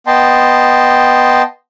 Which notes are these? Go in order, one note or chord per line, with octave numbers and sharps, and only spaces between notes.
B3 D#5 G5 A5 C6